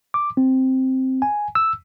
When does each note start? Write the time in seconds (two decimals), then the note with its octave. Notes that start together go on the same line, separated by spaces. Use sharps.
0.14 D6
0.37 C4
1.22 G#5
1.55 E6